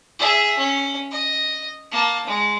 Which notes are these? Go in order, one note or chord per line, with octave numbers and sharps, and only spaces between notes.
G#4 E5
C#4
D#5
A#3 A5
G#3